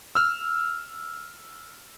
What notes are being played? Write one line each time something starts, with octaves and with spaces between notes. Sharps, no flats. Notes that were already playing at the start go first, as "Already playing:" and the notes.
E6 F6